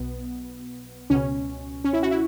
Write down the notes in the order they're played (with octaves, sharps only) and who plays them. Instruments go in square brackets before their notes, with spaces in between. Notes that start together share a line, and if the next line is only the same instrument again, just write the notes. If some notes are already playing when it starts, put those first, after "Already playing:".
Already playing: [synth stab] B1 B2 B3
C#2 B2 C#4
C#4
E4
F#4
E4